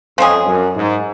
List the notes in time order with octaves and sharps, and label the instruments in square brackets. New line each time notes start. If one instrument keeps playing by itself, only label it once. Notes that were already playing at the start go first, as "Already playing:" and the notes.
[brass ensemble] F2 [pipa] F3 G#3 C#4 G#4
[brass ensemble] F#2
G#2